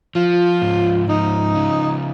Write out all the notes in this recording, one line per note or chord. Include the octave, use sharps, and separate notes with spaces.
F3 F4
G#2
F3 D#4
C#3